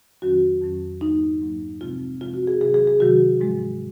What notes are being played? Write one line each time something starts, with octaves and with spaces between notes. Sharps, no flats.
F2 D#3 F#3 C#4 F#4
F2 D#3 F#3 C#4
G#2 F#3 A#3 D#4
G#2 F#3 A#3
C3 F3 G#3 C4 F4
C3 F3 G#3 C4 F4
F#4
G#4
C3 D#3 F#3 G#4
G#4
G#4
C3 D#3 F#3 F#4
G#2 F3 G#3